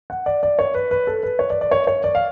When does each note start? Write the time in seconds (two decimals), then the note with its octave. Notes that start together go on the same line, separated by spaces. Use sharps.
0.10 F#5
0.26 D5
0.43 D5
0.59 C#5
0.74 B4
0.91 B4
1.07 A4
1.23 B4
1.39 C#5
1.50 D5
1.61 D5
1.71 C#5
1.87 C#5
2.04 D5
2.15 F5